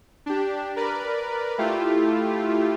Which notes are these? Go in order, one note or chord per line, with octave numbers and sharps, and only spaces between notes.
D4 G4
A#4 B4 D5
A3 E4 F4 G4